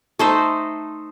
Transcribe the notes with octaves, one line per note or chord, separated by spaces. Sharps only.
A3 D#4 C5